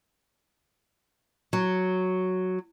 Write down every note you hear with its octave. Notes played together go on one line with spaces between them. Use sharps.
F#3